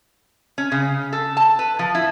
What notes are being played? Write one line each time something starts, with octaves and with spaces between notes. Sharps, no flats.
C#4
C#3
A4
A5
B4
F3
E4